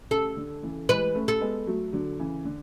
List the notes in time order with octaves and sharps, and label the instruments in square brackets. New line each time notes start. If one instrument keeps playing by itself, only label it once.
[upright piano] C#3 [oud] A4
[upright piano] D3
C#3 E3
[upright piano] E3 G#3 [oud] B4
[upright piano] A3 C#4
[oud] A4
[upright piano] G#3 B3
F#3 A3
D3 F#3
C#3 E3
D3